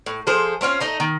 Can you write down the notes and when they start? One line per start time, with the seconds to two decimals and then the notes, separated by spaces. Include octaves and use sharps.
0.06 A2
0.27 F3 G#4 A4 C5
0.61 A3 C4 C#4 F4
0.80 A3 D#4 D#5
1.00 D#3